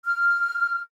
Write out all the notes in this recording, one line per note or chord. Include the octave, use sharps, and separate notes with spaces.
F6